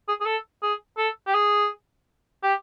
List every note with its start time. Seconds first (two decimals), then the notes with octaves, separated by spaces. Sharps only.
0.08 G#4
0.21 G#4
0.25 A4
0.62 G#4
0.98 A4
1.27 G4
1.34 G#4
2.43 G4